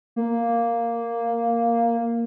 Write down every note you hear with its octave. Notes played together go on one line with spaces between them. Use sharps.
A#3